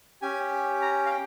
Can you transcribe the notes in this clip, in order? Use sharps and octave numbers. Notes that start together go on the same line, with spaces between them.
C#4 G4 G#5
A#5
F5
G5